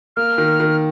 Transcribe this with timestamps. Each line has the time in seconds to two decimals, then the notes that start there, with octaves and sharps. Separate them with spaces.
0.16 A#3 F6
0.38 D#3
0.60 D#3